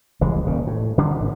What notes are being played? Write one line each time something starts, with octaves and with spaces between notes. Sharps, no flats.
F1 C2 E3 G#3
D#1 C#3
A2
D3 D#3 G3 D4
G#1